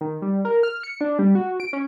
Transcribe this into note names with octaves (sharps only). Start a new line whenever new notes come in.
D#3
G3
A#4
F6
C#7
D4
G3
F#4
D7
C#4